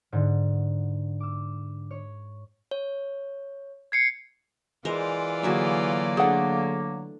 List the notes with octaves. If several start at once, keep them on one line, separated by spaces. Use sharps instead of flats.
G#2 D3
D6 E6
C#5
C#5
G#6 C7 C#7
E3 G#3 F4 A#4 C5 D5
D3 F#3 A#3 F#4 G#4 E5
A3 D4 G#4 F#5